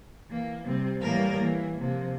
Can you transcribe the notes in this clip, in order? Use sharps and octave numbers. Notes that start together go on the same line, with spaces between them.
E3 A#3
C3 G3 C4
A2 E3 G3 A#3 A#4
E3 A#3
C3 F3 A#3